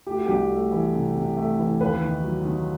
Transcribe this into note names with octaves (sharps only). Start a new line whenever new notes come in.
A3 G4
F#4
C2 G4
A3
E3
C3
C3
A3
E3
D#2 B4
D#3
F#3
D#3